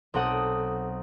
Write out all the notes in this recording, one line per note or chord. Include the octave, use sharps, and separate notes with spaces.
B1 C4 A4 F#5 D#6